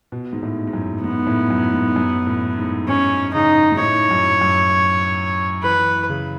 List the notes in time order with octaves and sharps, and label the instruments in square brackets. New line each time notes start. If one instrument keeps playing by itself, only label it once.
[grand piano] B2
G#2
A2
G#2
F#2
[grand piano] G#2 [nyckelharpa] B3
[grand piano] A2
F#2
G#2
F#2
A2
G#2
[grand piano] G#2 [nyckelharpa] C#4
[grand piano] C#3 [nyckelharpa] D#4
[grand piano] D#3
G#2
[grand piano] A2 [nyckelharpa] C#5
[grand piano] F#2
F#2
[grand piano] E3 [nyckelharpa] B4
[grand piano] E3
C#3